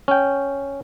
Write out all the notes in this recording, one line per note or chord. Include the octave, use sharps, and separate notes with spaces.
C#4 G5